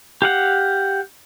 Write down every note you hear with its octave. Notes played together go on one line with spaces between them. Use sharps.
G4 F5 F#5